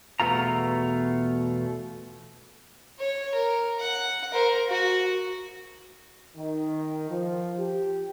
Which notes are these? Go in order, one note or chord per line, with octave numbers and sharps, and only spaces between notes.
E2 B2 A3 F4 A#5
C#5
A#4
F#5
A#4 C5
F#4
D#3
F3
G4